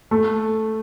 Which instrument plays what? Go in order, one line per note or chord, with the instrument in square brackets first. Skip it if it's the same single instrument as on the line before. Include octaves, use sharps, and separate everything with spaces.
[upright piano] A3